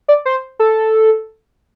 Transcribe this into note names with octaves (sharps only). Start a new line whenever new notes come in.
D5
C5
A4